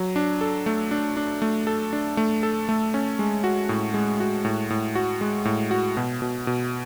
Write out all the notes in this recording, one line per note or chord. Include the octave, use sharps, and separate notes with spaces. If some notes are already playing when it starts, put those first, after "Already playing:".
Already playing: F#3
D4
A4
A3
D4
D4
A3
A4
D4
A3
A4
A3
C#4
G#3
F#4
A2
G#3
F#4
A2
A2
F#4
G#3
A2
F#4
B2
B2
B2